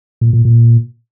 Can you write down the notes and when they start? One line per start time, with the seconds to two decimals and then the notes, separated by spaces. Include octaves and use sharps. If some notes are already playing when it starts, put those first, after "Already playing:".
0.21 A#2
0.33 A#2
0.45 A#2